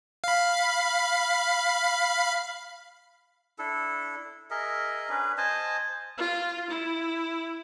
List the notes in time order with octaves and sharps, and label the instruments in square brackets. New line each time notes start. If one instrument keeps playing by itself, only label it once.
[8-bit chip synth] F5 B5
[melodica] D4 E4 A4
G#4 A#4 D#5 E5
C#4 D4 G#4 B4
C5 D#5 G#5 A5
[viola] F4
E4